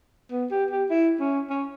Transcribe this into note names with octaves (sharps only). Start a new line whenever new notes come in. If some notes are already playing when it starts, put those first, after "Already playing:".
B3
G4
G4
E4
C#4
C#4